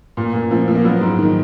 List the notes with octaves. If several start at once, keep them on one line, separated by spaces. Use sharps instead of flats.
A#2
A#2
F3
F3
A#3
F#3 B3
G#2
D#3